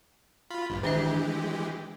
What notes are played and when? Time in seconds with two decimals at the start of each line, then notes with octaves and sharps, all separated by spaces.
0.50 F4 B5
0.70 A#1 G2
0.83 D#3 E3 G#3 D4 G4 E5